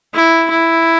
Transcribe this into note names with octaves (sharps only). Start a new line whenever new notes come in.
E4
E4